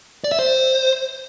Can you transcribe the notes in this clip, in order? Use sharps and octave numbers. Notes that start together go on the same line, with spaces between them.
D5
E5
C5